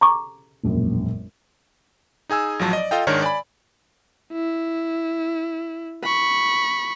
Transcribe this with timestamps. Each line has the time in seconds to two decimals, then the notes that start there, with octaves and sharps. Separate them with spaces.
0.01 A#5 C#6 D6
0.63 E1 A#1 F#2
2.29 D#4 G#4 G#5 E6
2.59 A1 F3 F#3 A5
2.73 D5 D#5
2.91 F4 A4 D#5 F5 G5
3.07 G#2 D#3 G#3 D4 A#4 C#5
3.22 D5 G#5 B5
4.32 E4
6.04 B5 C#6